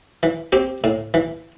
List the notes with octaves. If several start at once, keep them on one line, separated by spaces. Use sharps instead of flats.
E3
C4 G4
A2
E3